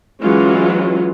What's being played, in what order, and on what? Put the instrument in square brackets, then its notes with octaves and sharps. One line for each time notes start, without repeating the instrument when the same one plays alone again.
[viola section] E3 F#3 G#3 C#4 F4